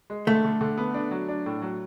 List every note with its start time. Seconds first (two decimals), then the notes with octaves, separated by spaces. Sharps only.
0.10 G#3
0.27 D3 A3
0.45 D3
0.61 D3
0.77 B3
0.94 D4
1.11 F#3
1.28 D4
1.46 A2
1.62 F#3